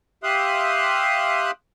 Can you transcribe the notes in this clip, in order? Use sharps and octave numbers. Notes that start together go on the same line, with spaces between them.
G4 E5 F5 C6 D#6 F#6